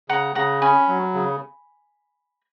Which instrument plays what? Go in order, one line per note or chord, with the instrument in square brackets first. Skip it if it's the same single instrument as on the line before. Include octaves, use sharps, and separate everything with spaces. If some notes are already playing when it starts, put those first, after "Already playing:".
[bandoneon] C#3 [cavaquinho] F#5 A#5
[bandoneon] C#3 [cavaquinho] F#5 A#5
[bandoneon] C#4 [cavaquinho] G#5 B5
[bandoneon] F#3
C#3